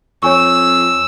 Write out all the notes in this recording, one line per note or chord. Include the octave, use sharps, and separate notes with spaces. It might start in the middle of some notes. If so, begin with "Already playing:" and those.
F2 C#5 G#5 C#6 E6